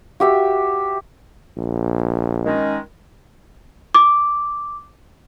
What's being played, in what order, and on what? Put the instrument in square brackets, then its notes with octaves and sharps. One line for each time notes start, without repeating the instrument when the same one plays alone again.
[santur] F#4 G4 E5
[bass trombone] A#1
[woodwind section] D#3 G#3 C#4
[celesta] D6